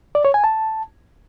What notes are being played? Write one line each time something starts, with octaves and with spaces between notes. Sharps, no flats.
D5
C#5
G#5
A5